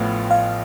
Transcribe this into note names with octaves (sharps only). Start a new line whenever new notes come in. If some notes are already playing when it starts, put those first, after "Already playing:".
Already playing: A1 A2 F3 B3 F4
F5